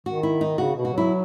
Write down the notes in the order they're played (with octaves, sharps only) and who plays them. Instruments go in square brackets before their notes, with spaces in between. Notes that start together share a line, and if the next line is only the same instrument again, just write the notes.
[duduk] D#3 [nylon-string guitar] F#4
[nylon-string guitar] E4
D#4
[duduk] C#3 [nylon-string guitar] F#4
[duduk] B2
[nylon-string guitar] F#4
[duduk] F#3 [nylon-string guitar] E4